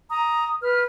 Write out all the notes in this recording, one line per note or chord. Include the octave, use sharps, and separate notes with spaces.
A#5 D#6
B4 F6